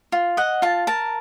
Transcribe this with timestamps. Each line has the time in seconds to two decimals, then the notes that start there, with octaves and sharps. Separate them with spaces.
0.12 F4
0.37 D#5 F#5
0.62 F4 A5
0.87 A#4 A5